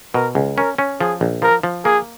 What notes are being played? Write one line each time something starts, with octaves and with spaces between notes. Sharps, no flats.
B2 A#4
C#2
C#4 A#4
C#4
F3 G#4
A#1
F3 A#4
F3
A#3 G#4